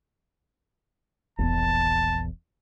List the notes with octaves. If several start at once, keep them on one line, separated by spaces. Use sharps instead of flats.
E1 A#1 E2 B3 A5